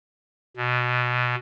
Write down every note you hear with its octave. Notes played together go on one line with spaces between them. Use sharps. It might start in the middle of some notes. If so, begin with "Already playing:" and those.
B2